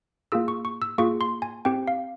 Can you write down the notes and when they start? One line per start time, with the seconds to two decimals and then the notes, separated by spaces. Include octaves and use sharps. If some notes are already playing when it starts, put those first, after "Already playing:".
0.32 A#3 F4 G#4 E6
0.48 C#6
0.65 C#6
0.82 E6
0.98 A#3 F4 G#4 C#6
1.21 C6
1.42 G#5
1.65 C4 G4 G5
1.87 F5